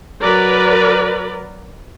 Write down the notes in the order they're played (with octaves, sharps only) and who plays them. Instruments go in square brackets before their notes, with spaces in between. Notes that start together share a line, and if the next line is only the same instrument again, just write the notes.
[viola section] F#3 A#4 B4 D5